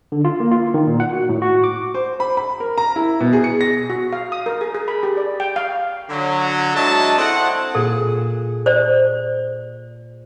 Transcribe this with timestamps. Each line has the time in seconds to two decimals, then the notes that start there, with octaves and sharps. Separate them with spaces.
0.12 D3
0.25 F4
0.40 A#3
0.52 F4
0.74 D#3
0.87 A#2
1.00 F#5
1.12 F#4
1.29 A2
1.42 F#4
1.64 D6
1.94 C5
2.20 B5
2.37 B5
2.60 A#4
2.78 A#5
2.96 E4
3.20 B2
3.33 G#4
3.44 C#7
3.61 A#6
3.90 F#4
4.13 F5
4.32 D#6
4.46 A#4
4.61 G#4
4.75 G#4
4.88 B5
5.03 G4
5.17 D5
5.40 G5
5.56 F5
6.10 D3 F#3
6.76 F#3 G#3 D4 E4 D#5 A5
7.18 C4 E4 A4 F#5
7.75 A#2 G#4 A4
8.66 C5 D5